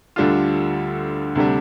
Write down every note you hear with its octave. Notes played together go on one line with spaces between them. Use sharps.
D2 D3 G3 D4 F4
D2 C3 G3 D4